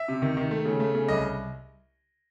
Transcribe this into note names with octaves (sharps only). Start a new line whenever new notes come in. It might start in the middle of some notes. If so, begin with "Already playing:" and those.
Already playing: E5
C3
D#3
D#3
A3
C#3
A3
C#3
C2 D#5